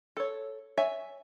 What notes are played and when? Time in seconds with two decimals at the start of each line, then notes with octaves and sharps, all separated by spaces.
0.17 A4 C#5
0.77 C#5 E5 G#5